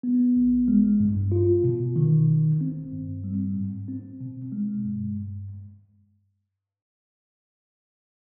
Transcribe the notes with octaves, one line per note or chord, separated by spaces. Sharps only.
B3
B1
G#3
G2
F4
B2
D#3
G1
C4
G2
G3
G#2
C4
B2
G#3
G2